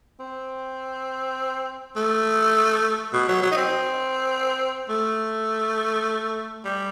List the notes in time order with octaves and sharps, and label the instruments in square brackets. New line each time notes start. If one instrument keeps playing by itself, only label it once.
[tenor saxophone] C4
A3
B2
F#3
F#3
D#4
C4
A3
G3